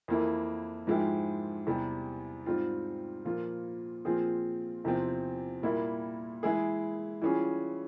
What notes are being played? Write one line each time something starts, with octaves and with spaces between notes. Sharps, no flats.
F2 E3 A#3 E4
G#2 F3 G#3 E4 G4
E2 C3 G3
G#2 G3 C4 F4
A#2 F3 A#3 F4
A#2 F3 C4 F4 G#4
E2 C3 F3 C4
A#2 G3 A#3 E4
E3 G#3 E4 G#4
E3 G3 C#4 F4 G#4